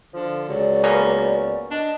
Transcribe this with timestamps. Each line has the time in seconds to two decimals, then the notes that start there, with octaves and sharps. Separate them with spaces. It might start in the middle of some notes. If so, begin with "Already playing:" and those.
0.13 D3 F3
0.49 C#2 F#3 D5
0.84 A#3 B3 C#4
1.71 D4 D#5